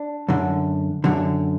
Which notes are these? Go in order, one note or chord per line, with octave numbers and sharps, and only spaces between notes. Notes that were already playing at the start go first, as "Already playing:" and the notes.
Already playing: D4
F#2 D3
F#2 D3